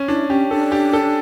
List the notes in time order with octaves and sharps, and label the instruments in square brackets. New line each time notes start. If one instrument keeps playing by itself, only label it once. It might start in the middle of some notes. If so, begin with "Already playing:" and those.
Already playing: [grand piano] C#4
[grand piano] D4 [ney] E4
[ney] C#4 [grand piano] G4
[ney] D4 [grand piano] A4
[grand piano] G4
A4